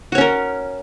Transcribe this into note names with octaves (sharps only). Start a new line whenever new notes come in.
C#4 F#4 A#4 C#5